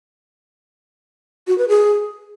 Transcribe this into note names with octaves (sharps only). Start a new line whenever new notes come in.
F#4
B4
G#4